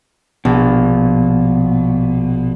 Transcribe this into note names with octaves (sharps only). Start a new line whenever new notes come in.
A#1 B2